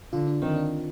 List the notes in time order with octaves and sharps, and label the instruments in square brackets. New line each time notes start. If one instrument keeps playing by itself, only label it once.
[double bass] D3 [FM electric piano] F4
[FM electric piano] D4
[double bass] D#3 [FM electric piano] C4
[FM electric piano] D4